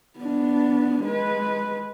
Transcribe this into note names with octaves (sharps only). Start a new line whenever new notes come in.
B3 D4
G#3 B4